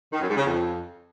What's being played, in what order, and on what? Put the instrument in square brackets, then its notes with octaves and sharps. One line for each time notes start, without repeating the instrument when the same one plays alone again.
[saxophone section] D#3
F#2
G#2
C#3
F2